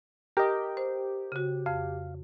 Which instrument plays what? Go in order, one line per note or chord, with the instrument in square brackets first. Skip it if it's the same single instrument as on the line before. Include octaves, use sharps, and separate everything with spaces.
[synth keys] G4 [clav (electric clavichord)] A#4 D#5
[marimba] C5
C#3 F#4
[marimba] F2 [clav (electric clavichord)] F5